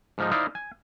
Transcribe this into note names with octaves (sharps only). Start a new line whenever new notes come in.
G#2 F3 D#4
D#4 E4 C5 D5 D#5 F5
G#5